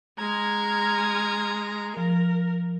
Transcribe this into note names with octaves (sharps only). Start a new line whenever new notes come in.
G#3 A#5 F6 G#6
F3 A#4